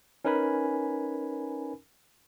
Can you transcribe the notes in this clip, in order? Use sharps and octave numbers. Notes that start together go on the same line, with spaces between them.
C#4 D#4 A#4 B4 G#5 B5